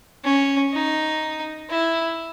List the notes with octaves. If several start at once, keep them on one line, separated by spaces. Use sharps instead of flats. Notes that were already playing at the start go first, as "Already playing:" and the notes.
C#4
D#4
E4